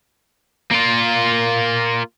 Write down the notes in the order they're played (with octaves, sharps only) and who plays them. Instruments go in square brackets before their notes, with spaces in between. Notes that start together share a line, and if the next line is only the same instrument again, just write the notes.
[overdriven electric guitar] A#3 F4